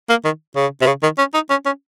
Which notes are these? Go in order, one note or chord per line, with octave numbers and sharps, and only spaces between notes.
A#3
D#3
C#3
C3
C#3
D#3
C#4
D#4
C#4
C#4